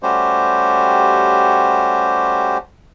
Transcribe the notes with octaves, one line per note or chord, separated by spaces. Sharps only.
G3 A3 C#4 F#4 G4 C5